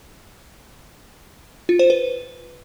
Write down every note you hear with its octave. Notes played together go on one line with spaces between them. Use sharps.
F4
C5
B4